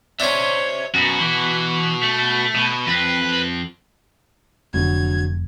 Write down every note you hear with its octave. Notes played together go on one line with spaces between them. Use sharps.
C#4 D4 C5 C#5 E5
F#2 B2 F#4
E3
A3
B2
F2 C4 B4
F1 D3 F#3 G#6